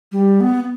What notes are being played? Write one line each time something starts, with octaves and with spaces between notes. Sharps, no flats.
G3
B3